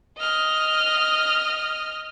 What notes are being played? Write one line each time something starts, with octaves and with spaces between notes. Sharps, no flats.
D#5 F6